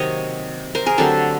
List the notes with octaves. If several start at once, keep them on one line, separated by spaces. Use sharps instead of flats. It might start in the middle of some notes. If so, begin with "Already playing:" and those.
Already playing: C3 D#3 F#3 A#3 C#5 D#5
A#4 C5
G#4 A#4
D3 F#3 A3 C4 G4 A4